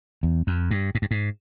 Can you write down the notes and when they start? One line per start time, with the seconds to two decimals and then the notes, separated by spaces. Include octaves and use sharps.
0.23 E2
0.47 F2
0.71 G2
0.95 G#2
1.02 G2
1.11 G#2